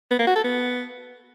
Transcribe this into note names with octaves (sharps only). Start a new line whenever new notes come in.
B3
A#3
F#4
A4
B3